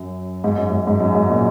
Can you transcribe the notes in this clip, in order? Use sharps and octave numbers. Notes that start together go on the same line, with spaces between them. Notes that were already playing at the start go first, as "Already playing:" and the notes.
Already playing: F#2
G#2
F#2
G#2
G#2
F#2
G#2
A#2